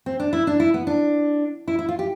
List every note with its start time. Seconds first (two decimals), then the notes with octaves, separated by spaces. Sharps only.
0.06 C4
0.20 D4
0.33 E4
0.47 D4
0.60 E4
0.74 B3
0.87 D4
1.68 E4
1.79 E4
1.89 F4
1.99 G4